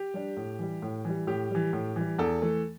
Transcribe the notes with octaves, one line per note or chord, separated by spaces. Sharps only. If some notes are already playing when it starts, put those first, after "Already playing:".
Already playing: G4
G3 D4
A2
E3 G3
A2
E3 G3
A2 G4
E3 G3
A2
E3 G3
E2 A4
E3 A3